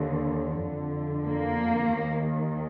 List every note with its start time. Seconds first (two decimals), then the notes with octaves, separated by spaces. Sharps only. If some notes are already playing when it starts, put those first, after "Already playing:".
Already playing: D#2 D3
0.62 F2 D3
1.24 A#3
1.87 D#2 D#3